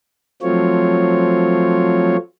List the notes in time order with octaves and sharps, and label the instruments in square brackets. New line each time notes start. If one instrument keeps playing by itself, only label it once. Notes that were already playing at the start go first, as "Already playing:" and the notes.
[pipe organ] F3 F#3 A3 C4 F4 C#5